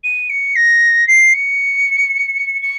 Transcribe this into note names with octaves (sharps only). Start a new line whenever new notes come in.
D#7
C#7
A#6
C7
C#7
C#7